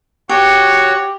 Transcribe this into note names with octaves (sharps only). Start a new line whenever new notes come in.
F#4 G4 C#5